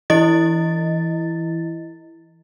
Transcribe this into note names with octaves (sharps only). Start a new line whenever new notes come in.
E3 E4 D#5 A6